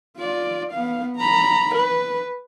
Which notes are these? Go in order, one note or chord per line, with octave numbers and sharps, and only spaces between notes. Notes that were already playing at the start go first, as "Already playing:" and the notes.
F4 D5
B3 F5
A#5 B5
B4